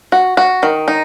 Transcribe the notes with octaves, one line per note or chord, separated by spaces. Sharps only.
F#4
F#4
D#3
D#4